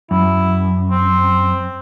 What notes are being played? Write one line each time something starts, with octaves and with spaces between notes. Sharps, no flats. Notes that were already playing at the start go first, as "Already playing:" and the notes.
F#2 E4
C4